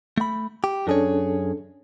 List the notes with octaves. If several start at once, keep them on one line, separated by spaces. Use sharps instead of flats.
A3 B5
G4
F#2 C#4 D4 G#4 A4 C#5